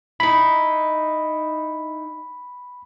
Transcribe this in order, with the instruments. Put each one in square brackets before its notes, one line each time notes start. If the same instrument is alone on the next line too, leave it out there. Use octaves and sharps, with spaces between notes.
[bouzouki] D#4 E4 [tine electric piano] B5